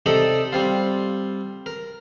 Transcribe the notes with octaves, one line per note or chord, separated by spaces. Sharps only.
C3 D#4 A4 D5 D#5 D#6
G3 C4 F4
A#4